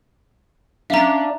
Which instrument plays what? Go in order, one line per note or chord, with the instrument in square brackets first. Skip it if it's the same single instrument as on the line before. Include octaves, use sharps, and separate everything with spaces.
[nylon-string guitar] C#4 F5 [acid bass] D4 [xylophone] E5 A#5